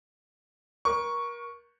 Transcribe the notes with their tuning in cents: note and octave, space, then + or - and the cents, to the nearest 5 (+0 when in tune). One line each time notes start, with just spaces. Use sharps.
A#4 +30 C#6 +0